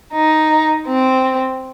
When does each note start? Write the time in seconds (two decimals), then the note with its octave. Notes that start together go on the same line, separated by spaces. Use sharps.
0.13 D#4
0.86 C4